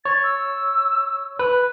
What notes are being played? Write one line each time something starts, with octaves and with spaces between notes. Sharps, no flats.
C#5 A6
E6
B4